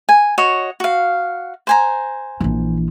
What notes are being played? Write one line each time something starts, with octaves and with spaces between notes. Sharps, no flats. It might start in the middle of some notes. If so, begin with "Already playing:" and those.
G#5
F#4 C#5 D#5
F#4 F5
C5 G#5 A#5
A#1 E3